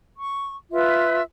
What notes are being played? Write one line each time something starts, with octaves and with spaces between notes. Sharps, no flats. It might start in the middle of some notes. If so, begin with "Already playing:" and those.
C#6
F4 B4 E5